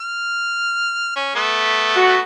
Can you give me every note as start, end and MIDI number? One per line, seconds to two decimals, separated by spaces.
0.01 1.14 89
1.16 1.34 61
1.35 2.22 57
1.35 2.22 59
1.96 2.17 66